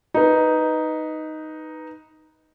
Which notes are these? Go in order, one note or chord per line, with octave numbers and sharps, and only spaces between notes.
D#4 B4